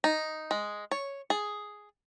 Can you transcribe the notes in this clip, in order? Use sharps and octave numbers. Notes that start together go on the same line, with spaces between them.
D#4
G#3
C#5
G#4